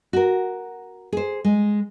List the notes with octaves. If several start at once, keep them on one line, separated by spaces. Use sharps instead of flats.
F#4 A#4
G#4 C5
G#3